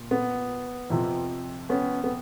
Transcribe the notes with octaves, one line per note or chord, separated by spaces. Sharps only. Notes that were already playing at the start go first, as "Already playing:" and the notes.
Already playing: A#2
B3
F2 C3 F3
B3 C#4
B3